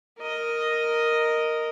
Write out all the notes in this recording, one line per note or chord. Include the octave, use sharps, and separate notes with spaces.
A#4 D#5